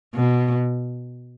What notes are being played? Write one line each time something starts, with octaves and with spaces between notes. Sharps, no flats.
B2